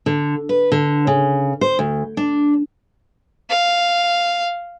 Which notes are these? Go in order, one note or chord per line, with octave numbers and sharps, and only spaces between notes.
D3
B4
D3
C#3
C5
D2
D4
F5